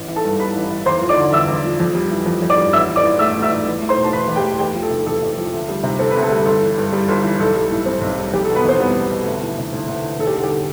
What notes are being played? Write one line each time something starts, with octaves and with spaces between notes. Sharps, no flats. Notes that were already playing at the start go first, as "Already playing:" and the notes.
Already playing: A1
E3
A4 A5
G2
G3 B4 B5
A1
E3
E2 C5 C6
F3
D5 D6
D3
E2 E5 E6
E2
F3
F2
G3
E3
F2
F2
D5 D6
G3
A1 E5 E6
E3
D5 D6
A2
A3 E5 E6
A1
E5 E6
E3
E2
A3
C5 C6
B2
A5
E2 B4 B5
E2
G4 G5
A3
E2 G4 G5
F3
A4
C3
E2 A4
E2
F3
D2
G3
C3
C4 A4
B4
D2
A4
G3
G1 A4
E3
G2
G3
G1
E3
B1 A4
G3
A2
C4
B1
G3
F1 G4
A4
B2
B3 B4
E2 C4 C5
G3 B3 B4
F1
B2
D2
E3
C3
D2
D2
E3
E1 A4
G4
D3 A4
G4